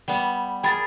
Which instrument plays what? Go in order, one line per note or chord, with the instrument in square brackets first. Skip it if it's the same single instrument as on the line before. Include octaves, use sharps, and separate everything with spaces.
[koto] G3 B3
[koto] G#4 A#4 [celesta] G5 B5 A6